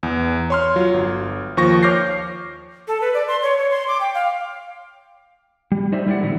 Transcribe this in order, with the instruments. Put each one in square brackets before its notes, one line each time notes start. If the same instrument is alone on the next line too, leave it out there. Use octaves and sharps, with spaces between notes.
[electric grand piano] E2
C#5 C6 F6
F#3 F4
G1
D#2 F3 C#6 A#6
C#5 D6 F6 G6 A#6 C7
[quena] A4
B4
D5
C6
C#5
C#5
C6
D6
G5
F5
[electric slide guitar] G3
D#4 C5 D5 E5
G3 A3 E4 C5 D5 F#5
A2 D3 E3 F#3 A3 B3